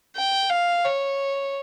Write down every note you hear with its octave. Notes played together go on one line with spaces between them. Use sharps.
G5
F5
C#5